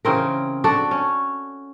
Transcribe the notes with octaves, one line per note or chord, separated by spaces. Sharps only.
C#3 E3 C4 A#4
D4 F#4 A4
C#4